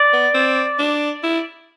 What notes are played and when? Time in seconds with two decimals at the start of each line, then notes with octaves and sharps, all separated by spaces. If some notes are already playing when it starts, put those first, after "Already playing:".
Already playing: D5
0.13 B3
0.34 C4
0.79 D4
1.23 E4